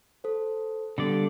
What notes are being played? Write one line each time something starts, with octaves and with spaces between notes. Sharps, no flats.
A4 C5
D3 G3 B3 A4 D5